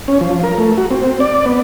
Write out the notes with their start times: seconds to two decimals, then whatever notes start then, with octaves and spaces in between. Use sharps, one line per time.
0.08 C#4
0.21 F3
0.44 A#4
0.58 A3
0.78 F#4
0.91 C4
1.20 D5
1.45 B3